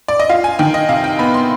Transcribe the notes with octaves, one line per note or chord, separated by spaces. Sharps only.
D5
D#5
F4 F5
G#5
D#3 G5
D#5
C3 F5
G5
B3 B5
C6